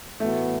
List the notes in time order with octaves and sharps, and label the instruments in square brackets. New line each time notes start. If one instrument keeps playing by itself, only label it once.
[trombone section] A2 E3 B3 F#4 [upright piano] A3